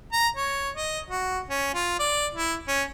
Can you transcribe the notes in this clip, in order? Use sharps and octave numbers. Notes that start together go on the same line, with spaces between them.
A#5
C#5
D#5
F#4
C#4
F4
D5
E4
C#4